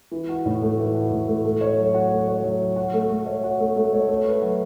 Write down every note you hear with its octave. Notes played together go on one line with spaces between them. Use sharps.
E3
F#4
A2
A3
E3
F#4
A2
A3
A3
C#5
F#3
F#4
A3
C#5
F#3
F#4
F#4
A3
A3
C#5
F#4
A3
A3
C#5
A3
B4
F#3